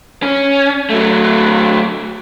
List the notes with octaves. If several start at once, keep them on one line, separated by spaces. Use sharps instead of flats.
C#4
F#3 A3